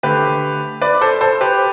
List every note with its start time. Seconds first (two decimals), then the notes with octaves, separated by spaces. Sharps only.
0.03 D3 A3 G4 B4
0.82 B4 D5
1.01 A4 C5
1.21 A4 C5
1.41 G4 B4